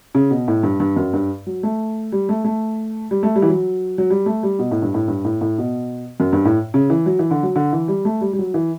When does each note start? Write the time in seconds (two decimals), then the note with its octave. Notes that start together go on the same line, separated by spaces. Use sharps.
0.15 C#3
0.31 B2
0.48 A2
0.63 G2
0.80 G2
0.96 F#2
1.14 G2
1.47 F#3
1.63 A3
2.12 G3
2.29 A3
2.44 A3
3.11 G3
3.23 A3
3.36 G3
3.42 E3
3.48 F#3
3.98 F#3
4.10 G3
4.26 A3
4.43 G3
4.59 B2
4.71 A2
4.82 G2
4.94 A2
5.08 G2
5.25 A2
5.41 A2
5.58 B2
6.20 F#2
6.33 G2
6.45 A2
6.74 C#3
6.90 E3
7.06 F#3
7.19 E3
7.31 D3
7.43 F#3
7.56 D3
7.72 E3
7.88 G3
8.05 A3
8.21 G3
8.33 G3
8.39 F#3
8.54 E3